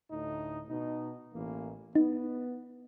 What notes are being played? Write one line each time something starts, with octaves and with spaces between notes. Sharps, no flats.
D2 A2 D#4
B2 D#4
A1 E3 A#3
B3 D#4